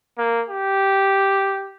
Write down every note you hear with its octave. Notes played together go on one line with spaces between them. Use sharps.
A#3
G4